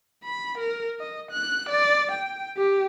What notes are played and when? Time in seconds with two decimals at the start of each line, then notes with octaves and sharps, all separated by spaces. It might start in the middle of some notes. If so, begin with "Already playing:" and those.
0.25 B5
0.58 A#4
1.00 D#5
1.32 F#6
1.70 D5
2.12 G5
2.57 G4